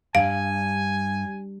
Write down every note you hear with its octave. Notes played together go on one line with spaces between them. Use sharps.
G2 F5 G#5